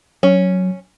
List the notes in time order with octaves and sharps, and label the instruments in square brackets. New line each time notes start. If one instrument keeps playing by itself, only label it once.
[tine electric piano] F#3 [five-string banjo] C#4